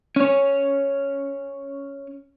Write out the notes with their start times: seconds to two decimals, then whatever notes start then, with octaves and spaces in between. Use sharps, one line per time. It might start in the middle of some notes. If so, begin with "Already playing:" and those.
0.16 C#4 C#5